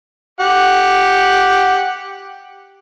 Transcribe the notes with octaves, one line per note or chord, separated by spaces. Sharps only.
G4 F#5